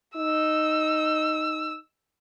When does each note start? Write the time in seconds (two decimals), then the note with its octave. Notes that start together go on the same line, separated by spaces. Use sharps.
0.16 D#4 E6